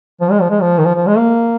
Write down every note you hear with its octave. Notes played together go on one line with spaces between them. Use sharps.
F3
G#3
F3
G#3
F3
D#3
F3
F3
G#3
A#3